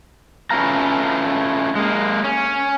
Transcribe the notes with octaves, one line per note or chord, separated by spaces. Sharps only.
A3 C#4 F4 B4 F5 A#5
G#3 A#3
C#4